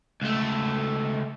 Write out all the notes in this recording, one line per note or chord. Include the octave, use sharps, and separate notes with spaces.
C#2 A3